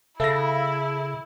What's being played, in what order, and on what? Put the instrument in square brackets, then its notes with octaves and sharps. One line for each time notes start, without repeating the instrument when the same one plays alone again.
[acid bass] C#3 [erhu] E4 [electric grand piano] A4 A#6 [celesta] E5